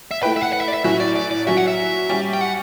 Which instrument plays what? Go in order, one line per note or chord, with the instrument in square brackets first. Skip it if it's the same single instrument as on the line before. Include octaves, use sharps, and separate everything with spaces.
[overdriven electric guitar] E5
[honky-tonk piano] A3 E4 B4 [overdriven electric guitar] G5
[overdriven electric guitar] E5
F#5
F#5
E5
D5
E5
[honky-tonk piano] A2 F#3 C#4 F#4 [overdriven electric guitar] E5
[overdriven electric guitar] D5
D5
D5
[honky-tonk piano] F#3 C#4 F#4 [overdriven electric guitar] E5
[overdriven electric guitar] F#5
E5
[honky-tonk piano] G3 C#4 G4
[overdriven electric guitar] G5
F#5